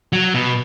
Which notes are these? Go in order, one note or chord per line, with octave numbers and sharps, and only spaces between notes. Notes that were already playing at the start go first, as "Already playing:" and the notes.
F#3
B2